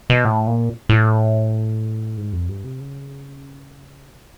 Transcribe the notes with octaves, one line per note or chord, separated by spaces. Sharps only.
B2
A2
A#2
A2
G#2
F2
G2
C3
C#3
B2
A2